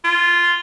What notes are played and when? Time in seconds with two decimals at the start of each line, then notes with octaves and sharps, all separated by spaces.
0.04 F4